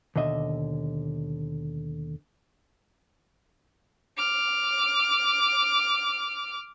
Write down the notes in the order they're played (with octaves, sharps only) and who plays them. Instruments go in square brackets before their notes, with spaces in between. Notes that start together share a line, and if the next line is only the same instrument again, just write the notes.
[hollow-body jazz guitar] D#2 B2 D3 D#5 E5
[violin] D6 F6